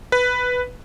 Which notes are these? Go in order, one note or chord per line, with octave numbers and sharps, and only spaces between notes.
B4